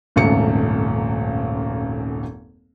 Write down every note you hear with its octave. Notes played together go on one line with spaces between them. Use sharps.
D#1 G#1 F#2 C#3 A3 C#7